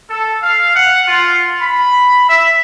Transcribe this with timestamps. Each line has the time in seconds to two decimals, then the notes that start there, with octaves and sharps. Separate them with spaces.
0.11 A4
0.43 F5
0.76 F#5
1.08 F4
1.62 B5
2.30 E5